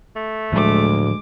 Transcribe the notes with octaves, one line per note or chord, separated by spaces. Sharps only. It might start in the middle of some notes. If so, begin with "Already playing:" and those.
A3
D2 A2 F3 F#3 G#3 D6